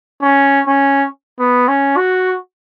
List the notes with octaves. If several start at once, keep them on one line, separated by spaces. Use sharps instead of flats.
C#4
C#4
B3
C#4
F#4